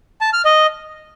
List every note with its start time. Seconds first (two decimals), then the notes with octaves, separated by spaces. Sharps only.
0.21 A5
0.33 F6
0.45 D#5